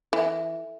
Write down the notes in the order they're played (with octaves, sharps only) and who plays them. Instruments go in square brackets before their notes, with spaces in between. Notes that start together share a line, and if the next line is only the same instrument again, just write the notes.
[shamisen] E3 [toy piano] A4 C5 E5